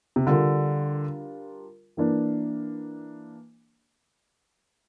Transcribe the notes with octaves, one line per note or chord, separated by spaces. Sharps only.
C3
D3 G3 D4 F4 A#4
E3 A#3 D4